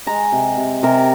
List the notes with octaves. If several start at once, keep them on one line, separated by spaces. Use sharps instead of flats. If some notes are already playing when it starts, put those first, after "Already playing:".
G#3 A#5
C3
C3
C3 A#4